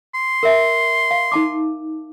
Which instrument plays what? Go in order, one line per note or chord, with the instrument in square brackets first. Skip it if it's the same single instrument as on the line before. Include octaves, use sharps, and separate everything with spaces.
[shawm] C6
[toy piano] A#4 E5
F5
D#4 A5 D6